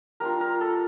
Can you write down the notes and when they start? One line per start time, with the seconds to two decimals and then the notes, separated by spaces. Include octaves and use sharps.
0.20 G3 D4 F4 A#4
0.41 A#4
0.61 A4